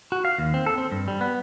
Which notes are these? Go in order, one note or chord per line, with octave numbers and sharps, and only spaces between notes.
F#4
F5
D#2
C4
A4
C4
G2
G3
B3